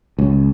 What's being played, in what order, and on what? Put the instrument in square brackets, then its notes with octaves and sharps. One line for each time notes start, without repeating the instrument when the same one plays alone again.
[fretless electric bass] C#2